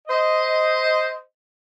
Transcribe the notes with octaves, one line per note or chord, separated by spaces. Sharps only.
C5 D#5